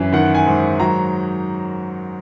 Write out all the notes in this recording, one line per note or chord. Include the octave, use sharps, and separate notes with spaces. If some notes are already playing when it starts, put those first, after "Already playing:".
Already playing: F#2 E3
D#3 F#5
G#5
G#2
F#3 A#5